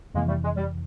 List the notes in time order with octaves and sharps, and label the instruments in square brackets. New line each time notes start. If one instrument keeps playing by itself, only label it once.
[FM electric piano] F2 C3 E3 [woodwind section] G#3 A#3
[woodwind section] G3 A3
G#3
G3